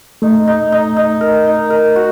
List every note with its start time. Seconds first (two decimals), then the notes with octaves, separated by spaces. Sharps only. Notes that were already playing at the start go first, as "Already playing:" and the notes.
0.22 A3 D#4
0.47 D#4
0.72 D#4
0.96 D#4
1.21 A#4
1.47 D#4
1.70 A#4
1.96 F#4